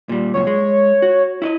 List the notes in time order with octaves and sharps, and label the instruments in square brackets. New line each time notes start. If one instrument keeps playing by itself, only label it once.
[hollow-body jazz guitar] A#2 G3
[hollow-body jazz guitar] C#2 F#2 A#2 [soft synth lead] C#5
[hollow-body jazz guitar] G#3
F#4
E4 C#5 D#5